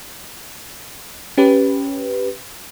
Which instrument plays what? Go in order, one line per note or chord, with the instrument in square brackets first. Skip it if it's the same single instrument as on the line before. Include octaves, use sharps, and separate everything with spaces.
[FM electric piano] C#4 G4 B4